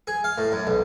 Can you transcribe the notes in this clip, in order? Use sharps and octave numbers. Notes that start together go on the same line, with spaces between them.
G#4
F5
A2
F#2
B1